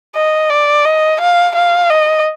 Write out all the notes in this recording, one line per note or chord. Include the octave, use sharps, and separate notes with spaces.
D#5
D5
D#5
F5
F5
D#5